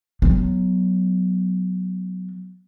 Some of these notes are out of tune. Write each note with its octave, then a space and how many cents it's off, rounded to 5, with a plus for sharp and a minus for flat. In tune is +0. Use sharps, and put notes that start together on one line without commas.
F#3 +0 B3 +0